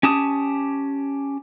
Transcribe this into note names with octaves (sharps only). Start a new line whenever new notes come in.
C#4 G4 A5 D#6